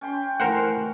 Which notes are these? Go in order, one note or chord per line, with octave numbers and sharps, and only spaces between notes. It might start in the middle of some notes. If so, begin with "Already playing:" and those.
C#4 G5 C6
E3 A3 A#4 C5 F#5